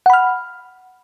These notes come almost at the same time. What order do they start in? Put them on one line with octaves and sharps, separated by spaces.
F#5 B5 F6